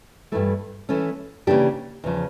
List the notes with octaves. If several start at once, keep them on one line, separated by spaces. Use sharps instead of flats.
G2 E3 A3
E3 A3 C#4
C#3 E3 A#3 D4 G4
E2 C#3 F3